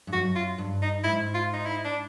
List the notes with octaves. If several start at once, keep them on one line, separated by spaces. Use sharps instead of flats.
G2
F#2 F#4
F4
G2
D#4
G#2 E4
F4
D#4
E4
D4